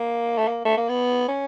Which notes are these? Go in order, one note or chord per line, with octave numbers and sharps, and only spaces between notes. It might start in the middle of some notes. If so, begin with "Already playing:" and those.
Already playing: A#3
A3
A#3
A3
A#3
B3
C#4